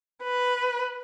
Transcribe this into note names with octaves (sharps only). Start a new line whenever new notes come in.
B4